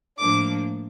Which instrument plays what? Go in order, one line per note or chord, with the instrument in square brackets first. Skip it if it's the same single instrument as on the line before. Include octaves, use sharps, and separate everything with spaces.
[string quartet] A2 F3 A#3 D4 D6